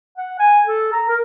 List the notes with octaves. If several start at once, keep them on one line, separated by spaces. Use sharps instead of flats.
F#5
G#5
A4
A#5
A#4